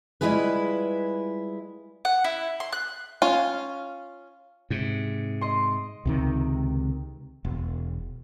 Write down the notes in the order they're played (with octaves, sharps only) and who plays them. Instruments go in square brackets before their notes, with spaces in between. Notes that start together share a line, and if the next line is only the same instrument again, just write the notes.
[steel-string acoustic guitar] G3 G#3 E4 F4 G#4 B4
[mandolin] F#5
E4
C6
F#6
[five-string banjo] C#4 F4
[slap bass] G#2 C3
[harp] D#5 C6
[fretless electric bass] C#2 C3 D#3
E1